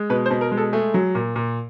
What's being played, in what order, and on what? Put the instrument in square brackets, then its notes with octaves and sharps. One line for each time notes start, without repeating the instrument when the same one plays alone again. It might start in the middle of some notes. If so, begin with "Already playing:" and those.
Already playing: [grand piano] G#3
B2 B4
C5
B2
A#4
G#3
A4
A3 G#4
F#3
A#2
A#2